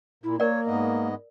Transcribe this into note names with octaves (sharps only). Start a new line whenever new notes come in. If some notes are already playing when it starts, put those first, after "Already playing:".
A#2 E4
A#3 A#4 C#5 D5
G#2 B3 D#5